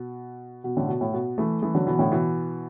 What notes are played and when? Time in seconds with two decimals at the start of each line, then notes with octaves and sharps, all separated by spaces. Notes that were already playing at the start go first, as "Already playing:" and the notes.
Already playing: B2
0.64 B2
0.76 A2 D3
0.88 B2
1.01 A2
1.13 B2
1.38 E3 A3
1.62 E3 A3
1.75 D3 F#3
1.87 B2 E3
1.99 A2 D3
2.11 B2 E3